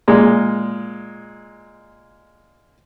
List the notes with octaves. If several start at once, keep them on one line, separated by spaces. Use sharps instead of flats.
A#2 G#3